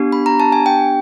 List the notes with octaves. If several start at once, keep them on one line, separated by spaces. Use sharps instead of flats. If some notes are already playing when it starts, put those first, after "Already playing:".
Already playing: B3 D4 G4
B5
A#5
A5
G#5
G5